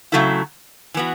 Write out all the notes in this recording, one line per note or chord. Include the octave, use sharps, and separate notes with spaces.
C#3 F#3 A3 E4
E3 B3 F#4